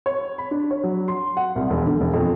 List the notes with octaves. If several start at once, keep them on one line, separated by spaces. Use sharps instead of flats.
C#5
B5
D4
C#5
F#3
C6
F#5
C2
E1
D3
E1
F2